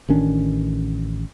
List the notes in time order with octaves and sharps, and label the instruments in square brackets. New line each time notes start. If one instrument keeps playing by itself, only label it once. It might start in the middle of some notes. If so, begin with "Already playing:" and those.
[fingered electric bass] A1 D#3 C#4 D4